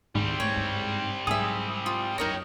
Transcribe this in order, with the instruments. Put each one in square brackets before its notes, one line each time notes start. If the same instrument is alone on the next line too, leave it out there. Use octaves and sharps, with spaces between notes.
[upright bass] D2 D#3 [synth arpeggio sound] G#2 [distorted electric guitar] G3 C4
[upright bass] A3 [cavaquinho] C#5
[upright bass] G2
[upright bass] G#2 F#3 [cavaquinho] G#4 E5 [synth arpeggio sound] D#6
[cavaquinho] F4
[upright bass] F#2 F#3 [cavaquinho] D#4 A#4 D#5 [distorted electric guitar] C#5 G5